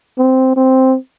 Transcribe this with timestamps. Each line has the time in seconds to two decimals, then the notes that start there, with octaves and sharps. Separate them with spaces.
0.18 C4
0.56 C4